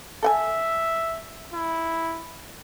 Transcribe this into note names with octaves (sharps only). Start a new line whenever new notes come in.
A4 E5 F#5 G#5
E4